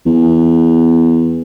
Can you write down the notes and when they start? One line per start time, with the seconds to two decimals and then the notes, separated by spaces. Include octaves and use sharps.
0.06 E2